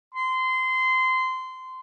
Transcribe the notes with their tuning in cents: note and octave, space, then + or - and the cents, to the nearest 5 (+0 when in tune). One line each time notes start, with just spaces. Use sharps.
C6 -20